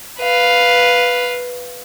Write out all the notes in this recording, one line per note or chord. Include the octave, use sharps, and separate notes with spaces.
B4 F5